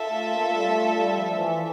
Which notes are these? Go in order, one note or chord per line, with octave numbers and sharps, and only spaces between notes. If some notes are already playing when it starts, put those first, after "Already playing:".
Already playing: F4 A4 E5
A3
A#3
A3
G3
A3
G3
F3
E3
E3